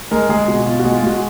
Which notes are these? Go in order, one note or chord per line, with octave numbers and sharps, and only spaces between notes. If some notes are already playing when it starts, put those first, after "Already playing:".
G#3 A#4
G#3 G#4
B2 F#4
B2 F4
F#4
G#3
F4
G#3 F#4